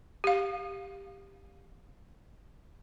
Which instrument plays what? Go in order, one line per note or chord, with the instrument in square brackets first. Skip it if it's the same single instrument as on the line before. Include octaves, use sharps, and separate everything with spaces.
[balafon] G4 F5